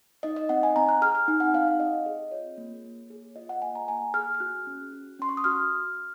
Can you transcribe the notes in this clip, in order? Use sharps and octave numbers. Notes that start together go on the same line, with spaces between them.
D#4 D#5
D#5
C4 F#5
G#5
C4 A#5
F#6
G#4 F6
F6
D#4 G#5
F#5
C4 F5
F5
C4 D#5
G#4
F4 C#5
A#3
A#3
G#4
F4 D#5
F#5
A#3 G#5
A#5
A#3 G#5
G#4 F6
F6
F#4 F#6
C#4
F#4
C#4 C6
C#6
D#6
F#4 F6